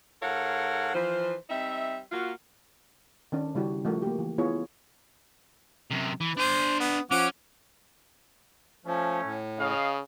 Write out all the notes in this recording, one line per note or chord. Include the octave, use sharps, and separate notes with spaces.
G#2 A4 A#4 C#5 F5 F#5
E3 F3 C5
G3 C4 D#4 E5
A#3 F4 F#4
D#3 C#4 D4
C#3 G3 E4 F#4 G4
F3 A3 F#4 A#4
A#3 F#4 G4
E3
B3 E4 F4 G#4 C#5
F#2 C3
E3
D4 C5 G#5
B3
F3 C#4 F#5 D6
F3 A3 C#4
A2
C#3 D#5 F5